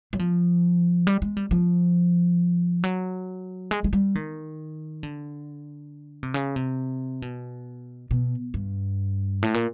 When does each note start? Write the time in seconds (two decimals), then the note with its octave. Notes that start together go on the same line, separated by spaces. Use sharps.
0.13 F#3
0.19 F3
1.07 G3
1.22 G#3
1.37 G3
1.51 F3
2.84 F#3
3.71 G#3
3.84 G#3
3.93 G3
4.15 D#3
5.03 D3
6.23 C3
6.34 C#3
6.56 C3
7.22 B2
8.11 B2
8.54 G2
9.42 A2
9.54 A#2